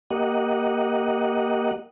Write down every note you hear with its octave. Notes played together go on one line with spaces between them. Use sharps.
A#3 G4 D#5 F#5